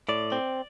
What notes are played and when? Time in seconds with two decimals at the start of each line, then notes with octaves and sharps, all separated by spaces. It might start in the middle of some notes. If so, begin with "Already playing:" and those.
0.09 A2 D5
0.32 C4